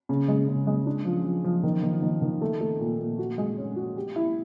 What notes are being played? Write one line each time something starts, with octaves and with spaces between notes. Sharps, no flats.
C#3
G#3
C#3
G#3
D4
F3
F3
F3
D#3
D#3
D#3
D#3
A3
A3
A#2
A#2
F#4
G#3
C#4
F#4
G4
E4